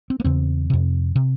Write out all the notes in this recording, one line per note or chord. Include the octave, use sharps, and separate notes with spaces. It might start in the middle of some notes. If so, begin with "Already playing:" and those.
C4
A#3
E2 C#3 C4
F2 C3
C3